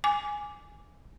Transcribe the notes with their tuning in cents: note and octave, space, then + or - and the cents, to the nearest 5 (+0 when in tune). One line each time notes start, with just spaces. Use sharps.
G#5 +0 D6 -10